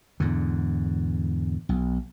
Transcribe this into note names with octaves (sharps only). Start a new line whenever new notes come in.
E2 G#2 D3
B1